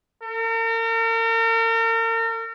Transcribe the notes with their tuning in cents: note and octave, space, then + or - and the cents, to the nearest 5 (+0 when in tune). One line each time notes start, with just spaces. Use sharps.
A#4 -40